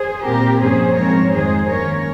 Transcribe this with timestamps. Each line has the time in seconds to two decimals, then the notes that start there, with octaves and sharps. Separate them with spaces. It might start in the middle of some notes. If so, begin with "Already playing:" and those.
Already playing: G#4 C5
0.25 A#2 G3 C4 G4 A#4
0.61 G2 F3 A#3 C#4 G#4 C5
0.97 G#2 F3 C4 A#4 C#5
1.33 F2 D#3 G#3 G#4 C5
1.69 G2 D#3 A#3 C#4 A#4 C#5